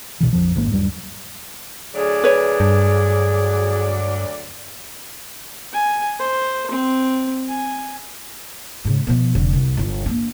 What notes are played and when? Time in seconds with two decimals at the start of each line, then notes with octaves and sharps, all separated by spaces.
0.21 A#1 B2 E3
0.33 A#1 F2 F3
0.55 G#1 G#2 A#3
0.71 D#1 G2 F#3 G3
1.94 D2 F#3 G#4 D5
2.24 B4 C#5
2.60 G2
5.73 G#5
6.19 C5
6.71 C4
7.48 G#5
8.85 G#2 C#3
9.07 B2 F3
9.35 F1 D3
9.53 C2
9.77 G1 F4
10.06 A#3 D4